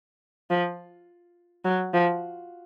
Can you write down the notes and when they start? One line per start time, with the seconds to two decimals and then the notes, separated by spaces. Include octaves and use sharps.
0.50 F3
1.65 F#3
1.94 F3